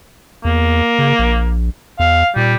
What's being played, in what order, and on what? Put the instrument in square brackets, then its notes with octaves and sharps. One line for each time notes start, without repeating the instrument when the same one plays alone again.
[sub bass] E2 [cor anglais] A#3
[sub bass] C#3
A#1
[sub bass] E2 [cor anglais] F5
[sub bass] A#2 [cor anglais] G3